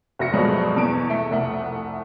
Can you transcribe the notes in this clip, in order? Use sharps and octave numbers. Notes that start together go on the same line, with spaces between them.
F1 F#4 E5 A#6 C#7
D2 G2 B2 F3 F#3 G#3
E2 B2 D7
A3
F1 C2 A3 F#5